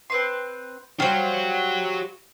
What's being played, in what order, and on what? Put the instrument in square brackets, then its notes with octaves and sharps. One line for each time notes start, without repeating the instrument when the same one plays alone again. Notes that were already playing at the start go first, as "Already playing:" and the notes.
[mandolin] C4 B4 C6
[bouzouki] G3 C5 [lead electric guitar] F#4 C#5 [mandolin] F5